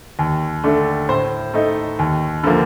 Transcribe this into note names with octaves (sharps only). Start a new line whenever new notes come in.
D#2
D3 A3 D4
A2 C5
A3 D#4
D#2
D3 F3 A#3